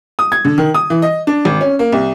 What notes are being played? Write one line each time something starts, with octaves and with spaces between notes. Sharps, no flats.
D#6
G#6
D3
D#3
D#6
E3
D#5
D4
G#1
C#4
A#3
C2